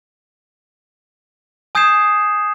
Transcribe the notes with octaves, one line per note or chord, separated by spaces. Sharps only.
G#5 D#6 G6 G#6 C7 E7